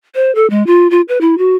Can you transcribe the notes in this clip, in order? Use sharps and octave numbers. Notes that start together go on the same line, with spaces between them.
C5
A4
G#3
F4
F4
B4
E4
F#4